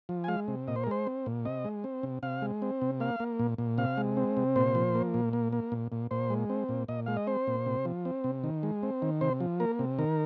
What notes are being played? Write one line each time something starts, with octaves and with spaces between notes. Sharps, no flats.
F3
G#5
G#3 F5
C3
A#2 D#5
C5
A#4
G#3 C5
C4
A#2
C3 D#5
G#3
C4
C3
C3 F5
G#3
C4
C3
A#3 F5
A#3
A#2
A#2
C3 F5
G#3
C4
C3
A#2 C5
F3
A#3
A#2
A#3
A#3
A#2
A#2
A#2 C5
G#3
C4
A#2
A#2 D#5
G#3 F5
D#5
C4 C5
A#2
C3
F3
C4
C3
D#3
G#3
C4
D#3
C3 C5
F3
A#3 A#4
C3
D#3 A#4